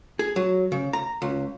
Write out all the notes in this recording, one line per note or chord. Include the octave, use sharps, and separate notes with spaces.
G#4
F#3
C#3
A#5
C#2